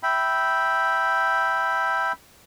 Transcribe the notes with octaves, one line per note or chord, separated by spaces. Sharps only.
E5 G5 B5